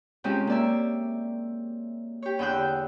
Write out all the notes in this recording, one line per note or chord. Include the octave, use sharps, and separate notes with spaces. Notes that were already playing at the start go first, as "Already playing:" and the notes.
C3 G#3 C4 C#4 F4 G4
A#3 D5 E5
G4 C#5
E2 D3 G5 E6 F#6 G6